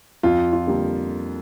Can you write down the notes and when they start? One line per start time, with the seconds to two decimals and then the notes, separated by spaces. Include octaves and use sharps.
0.23 F2 F4
0.53 F4
0.67 D3 G3 A#3